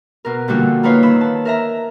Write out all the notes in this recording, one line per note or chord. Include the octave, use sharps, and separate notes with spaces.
B2 A#4
A#2 D3 F3 G3 F#4 E6
A#3 D#4 F4 B4 C#5 F5
D#3 B5 E6
A5
A#4 E5 A#5